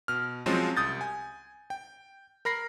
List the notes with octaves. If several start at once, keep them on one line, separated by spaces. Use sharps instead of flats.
B2 F6
F3 F#3 G#3 C4 C#4 F4
C2 D#6 G6 A6
G#5
G5
A#4 B5 A#6 C7